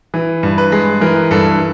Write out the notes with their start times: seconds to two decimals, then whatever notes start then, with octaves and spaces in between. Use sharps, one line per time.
0.14 E3
0.43 G2
0.58 B4
0.72 G#3
1.01 E3 A#4
1.31 G2 A4